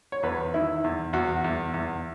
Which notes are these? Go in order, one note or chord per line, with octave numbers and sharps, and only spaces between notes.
C#5
E2 B4
D#3 E4
E2
E2 F#4
E2
E2